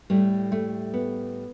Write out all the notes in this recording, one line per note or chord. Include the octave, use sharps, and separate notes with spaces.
A2 G3 A3
A3
B3